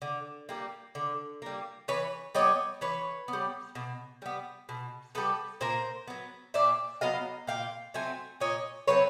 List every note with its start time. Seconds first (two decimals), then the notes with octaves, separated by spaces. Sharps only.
0.02 D3
0.49 G3 A#3
0.95 D3
1.42 G3 A#3
1.88 E3 B4 C#5
2.35 G3 B3 C#5 D#5
2.81 E3 B4 C#5
3.28 B3
3.33 G3
3.75 B2
4.22 G3 B3
4.69 B2
5.15 G3 B3 A4 B4
5.61 A#2 A#4 C5
6.07 F#3 B3
6.54 A#2 D5 E5
7.01 F#3 B3 D#5 F5
7.47 A#2 F5 G5
7.94 F#3 A3 C4 G#5
8.40 A#2 C#5 D#5
8.87 F#3 A3 C4 B4 C#5